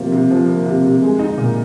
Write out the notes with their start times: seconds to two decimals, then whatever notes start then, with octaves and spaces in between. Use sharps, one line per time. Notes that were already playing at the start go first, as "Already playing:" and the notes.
Already playing: C3 F3 A#3
0.12 C3
0.31 F3
0.48 A#3
0.66 C3
0.84 C3
1.02 G#3
1.19 D#4
1.38 A#2